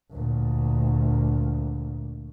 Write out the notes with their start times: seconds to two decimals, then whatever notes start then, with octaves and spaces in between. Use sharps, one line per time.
0.11 D2 A#2